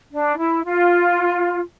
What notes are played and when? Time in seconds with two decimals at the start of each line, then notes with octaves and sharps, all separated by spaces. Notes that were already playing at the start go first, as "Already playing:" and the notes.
0.12 D4
0.38 E4
0.65 F4